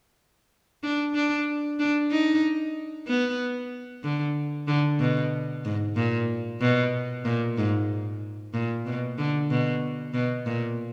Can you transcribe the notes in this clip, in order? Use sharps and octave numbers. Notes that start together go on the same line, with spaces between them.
D4
D4
D4
D#4
B3
D3
D3
B2
G#2
A#2
B2
A#2
G#2
A#2
B2
D3
B2
B2
A#2